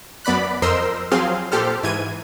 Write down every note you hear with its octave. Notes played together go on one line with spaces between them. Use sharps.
F#2 B3 D5 B5 F#6
F2 A#4 C5 D#5 C6 E6
F3 F#3 C4 G#4 F5 C6
A#2 G4 A4 C5 F6
G#2 E3 G#6 D#7